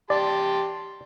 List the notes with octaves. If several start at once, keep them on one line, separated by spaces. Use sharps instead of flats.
G4 D5 A5 C6